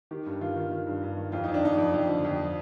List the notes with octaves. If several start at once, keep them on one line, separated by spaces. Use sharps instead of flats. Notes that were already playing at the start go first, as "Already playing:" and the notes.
D#3 G4
G2
D#3 F4
D#3
D#3
G2
G2
D#3
F2 F4
F2 D#4
D4
F2 D#4
F2
F2
D3
F2